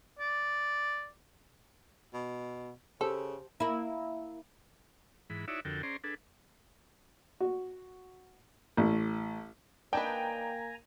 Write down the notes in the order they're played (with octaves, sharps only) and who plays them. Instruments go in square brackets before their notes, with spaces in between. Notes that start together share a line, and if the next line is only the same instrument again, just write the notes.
[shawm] D5
[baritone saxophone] B2
[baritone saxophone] C#3 [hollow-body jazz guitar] G4 C5 [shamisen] A4
[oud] A#3 E4
[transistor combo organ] G#2 E3 B5
D#4 E4 F#4 C#5 D5 E5
F2 D3 F#4 A4 A#4 G5
C#4 G#4 C5 D5 A#5 C6
D4 G#4 A4 B4
[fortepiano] F#4
A1
[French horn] A#3 [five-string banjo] D4 D#4 B4 [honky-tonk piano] G5 [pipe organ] G#5 A#5